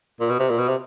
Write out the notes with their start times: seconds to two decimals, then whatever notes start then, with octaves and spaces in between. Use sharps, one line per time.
0.20 A#2
0.30 B2
0.39 C3
0.49 A#2
0.58 B2
0.68 C3